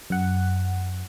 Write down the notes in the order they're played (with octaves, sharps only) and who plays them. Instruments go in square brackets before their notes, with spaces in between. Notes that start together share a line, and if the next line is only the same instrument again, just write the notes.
[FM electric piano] F#2 F#5